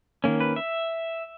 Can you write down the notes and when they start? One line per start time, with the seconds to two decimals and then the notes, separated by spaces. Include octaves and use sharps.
0.24 D#3 A#3 C#4
0.40 B4
0.56 E5